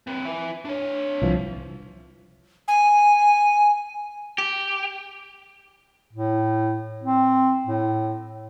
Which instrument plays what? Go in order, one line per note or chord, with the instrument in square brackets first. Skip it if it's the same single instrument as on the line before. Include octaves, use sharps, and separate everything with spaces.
[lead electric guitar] C4 B4
E4 G#5
D4 C#5
[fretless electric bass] C2 E3 F3
[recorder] G#5
[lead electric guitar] G4
[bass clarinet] A2
C4
A2